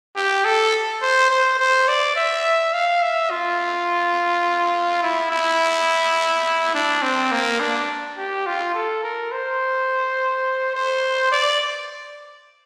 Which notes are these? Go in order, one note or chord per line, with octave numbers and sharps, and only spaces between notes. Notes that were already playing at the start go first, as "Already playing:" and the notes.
G4
A4
C5
C5
C5
D5
E5
F5
E5
F4
E4
E4
D4
C4
A#3
D4
G4
F4
A4
A#4
C5
C5
D5